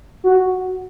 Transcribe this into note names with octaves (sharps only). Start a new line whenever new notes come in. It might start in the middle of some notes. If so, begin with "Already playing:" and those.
F#4